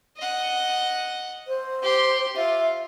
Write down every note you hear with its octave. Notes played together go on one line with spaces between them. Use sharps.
D#5 F#5
C5
G4 C6
F4 E5